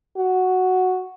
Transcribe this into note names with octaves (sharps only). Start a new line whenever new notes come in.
F#4